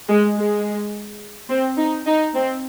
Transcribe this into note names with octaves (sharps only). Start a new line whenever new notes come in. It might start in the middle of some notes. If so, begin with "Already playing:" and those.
G#3
G#3
C4
D#4
D#4
C4